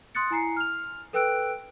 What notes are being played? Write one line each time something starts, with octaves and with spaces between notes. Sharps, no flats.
C6 D#6 F#6 A6 C#7
E4 G#5 A#5 C7 C#7
F6 F7
A4 B4 G5 E6 F#6 D7